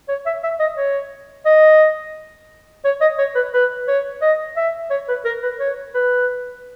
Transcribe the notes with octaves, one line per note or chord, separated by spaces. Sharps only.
C#5
E5
E5
D#5
C#5
D#5
C#5
D#5
C#5
B4
B4
C#5
D#5
E5
C#5
B4
A#4
B4
C#5
B4